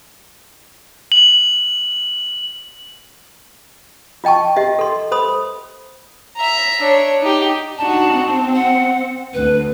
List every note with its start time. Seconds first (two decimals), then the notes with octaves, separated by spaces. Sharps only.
1.12 F#7
4.24 F4 D#5 G5 A5 C#6
4.56 G4 D#5 E5
4.79 A4 C6
5.11 A4 C5 B5 D#6
6.37 E5 A#5
6.81 D4 C#5
7.22 D#4 G4
7.78 D4 D#4 F#4 A5
8.14 C4
8.55 F#5
9.34 D2 B4